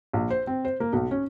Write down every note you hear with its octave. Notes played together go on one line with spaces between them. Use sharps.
A#1
C5
C4
C5
A#3
B1
C#4